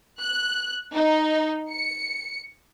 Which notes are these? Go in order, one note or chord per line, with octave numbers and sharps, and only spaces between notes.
F#6
D#4
C#7